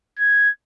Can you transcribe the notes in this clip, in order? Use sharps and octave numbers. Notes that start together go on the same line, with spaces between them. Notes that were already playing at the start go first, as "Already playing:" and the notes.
G#6